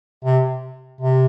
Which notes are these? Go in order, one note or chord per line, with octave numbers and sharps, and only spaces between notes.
C3
C3